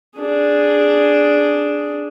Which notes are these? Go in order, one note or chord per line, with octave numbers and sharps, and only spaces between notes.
D4 G#4